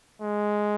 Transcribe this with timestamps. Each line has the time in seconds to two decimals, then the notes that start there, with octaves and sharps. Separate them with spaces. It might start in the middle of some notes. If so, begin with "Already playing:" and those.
0.22 G#3